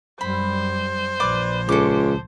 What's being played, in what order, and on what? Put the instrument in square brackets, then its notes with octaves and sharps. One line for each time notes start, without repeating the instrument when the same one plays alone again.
[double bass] F#2 G3 [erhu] C5 [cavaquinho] B5
[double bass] A#1 F3 [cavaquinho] B4 D5 D6
[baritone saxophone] C#2 [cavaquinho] A4 D6